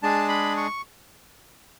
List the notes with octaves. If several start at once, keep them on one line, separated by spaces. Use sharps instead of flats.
G#3 D4 G#4 A5
B5
C#6